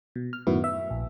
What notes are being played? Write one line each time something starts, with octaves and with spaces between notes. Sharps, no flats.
B2
F6
F#2 A2 D#3 B3 E4 F#4
E5
A#1